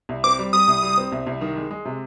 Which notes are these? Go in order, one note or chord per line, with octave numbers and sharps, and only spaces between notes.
C2
C4 D6
G3
G3 D#6
C2
G3
C4
C2
C2
D#3
G#3
G#3
C3